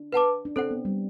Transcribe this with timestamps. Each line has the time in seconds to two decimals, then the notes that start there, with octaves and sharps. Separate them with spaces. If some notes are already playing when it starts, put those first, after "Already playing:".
Already playing: D4
0.12 B4 F#5 A5 D6
0.45 D4
0.56 C4 A4 C5 F#5
0.71 B3
0.85 G3